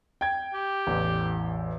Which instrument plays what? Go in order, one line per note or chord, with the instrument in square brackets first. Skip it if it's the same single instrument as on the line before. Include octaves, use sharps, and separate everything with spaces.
[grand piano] G5 G#6
[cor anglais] G4
[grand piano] A1 E2